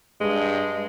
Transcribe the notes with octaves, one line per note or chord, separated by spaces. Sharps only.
G2 G#3